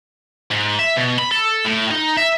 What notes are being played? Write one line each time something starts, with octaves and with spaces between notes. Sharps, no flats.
G#2
E5
B2
B5
A4
A2
D#4
E5